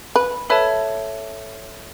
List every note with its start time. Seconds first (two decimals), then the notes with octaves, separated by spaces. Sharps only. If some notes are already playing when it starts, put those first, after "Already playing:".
0.16 B4
0.50 A4 B4 C#5 E5 A5